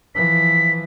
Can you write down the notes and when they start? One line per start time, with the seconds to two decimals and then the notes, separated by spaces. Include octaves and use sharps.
0.15 E3 F3 B6